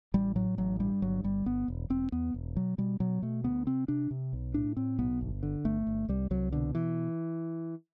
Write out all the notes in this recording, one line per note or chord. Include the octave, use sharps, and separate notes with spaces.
A1 G3
A2 F#3
A1 F#3
G2 G3
G1 F#3
G1 G3
G1 B3
E1
E1 C4
E2 B3
E1
B2 F#3
B2 G3
B2 F#3
B2 A3
D2 B3
C3 C4
C3 D4
C3
B1
A2 D4
A2 C4
B1 B3
G1
D3
G1 A3
G1
C2 G3
C2 F#3
B2 D3
E3